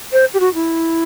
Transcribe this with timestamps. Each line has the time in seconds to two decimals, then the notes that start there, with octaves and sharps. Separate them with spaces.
0.12 C5
0.34 G4
0.40 F#4
0.54 E4